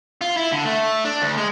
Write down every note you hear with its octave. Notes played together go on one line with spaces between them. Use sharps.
F4
E4
D3
A3
D4
D2
G#3